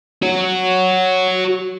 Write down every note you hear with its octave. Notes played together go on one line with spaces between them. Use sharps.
F#4 C#5